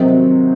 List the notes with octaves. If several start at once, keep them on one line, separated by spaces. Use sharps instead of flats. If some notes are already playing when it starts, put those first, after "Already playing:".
Already playing: C3 D#3 F#3 C4 D#4